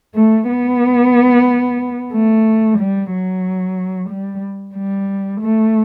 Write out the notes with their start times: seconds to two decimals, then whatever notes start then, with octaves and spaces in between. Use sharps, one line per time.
0.15 A3
0.48 B3
2.12 A3
2.79 G3
3.11 F#3
4.09 G3
4.75 G3
5.41 A3